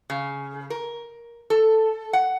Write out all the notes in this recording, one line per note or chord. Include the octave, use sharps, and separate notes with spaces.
C#3
A#4
A4
F#5